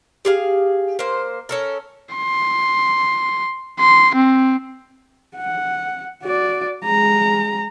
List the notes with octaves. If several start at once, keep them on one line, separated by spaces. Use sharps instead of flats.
G4 G#4 F5
A#3 C5
C#4 A4 A#4
C6
C6
C4
F#5
F#4 D5
G#3 A#5